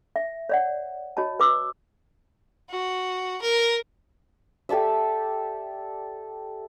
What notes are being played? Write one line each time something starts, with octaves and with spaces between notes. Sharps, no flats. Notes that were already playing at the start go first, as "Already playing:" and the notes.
E5
C#5 D5 F#5
F#4 C#5 D#5 A5
B4 D6 E6
F#4
A#4
G4 A4 D5 E5